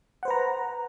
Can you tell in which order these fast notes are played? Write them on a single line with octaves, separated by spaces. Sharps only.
F#5 C5 B4 A#5